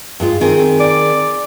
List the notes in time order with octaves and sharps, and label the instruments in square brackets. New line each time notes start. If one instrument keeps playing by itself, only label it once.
[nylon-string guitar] G2 G#3 F4
D#3 C4 G#4
[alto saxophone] D5